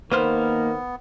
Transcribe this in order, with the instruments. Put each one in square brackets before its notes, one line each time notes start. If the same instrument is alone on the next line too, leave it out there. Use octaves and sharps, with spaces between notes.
[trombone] D#3 [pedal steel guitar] A#3 F6 [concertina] B3 [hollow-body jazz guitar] B4 C5